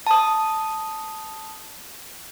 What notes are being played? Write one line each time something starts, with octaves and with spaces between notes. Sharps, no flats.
A5 D#6